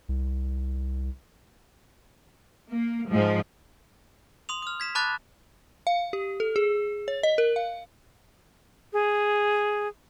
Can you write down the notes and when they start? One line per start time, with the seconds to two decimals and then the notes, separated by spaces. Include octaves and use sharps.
0.09 C2
2.69 A#3
3.10 G#2 F3
4.49 C6 D#6 F7
4.62 D#6 F6
4.80 G#6 B6 E7
4.95 A5 B5 D6 F#6 A6
5.87 F5
6.13 G4
6.40 A4
6.56 G#4
7.08 C#5
7.23 D#5
7.38 A#4
7.56 F5
8.93 G#4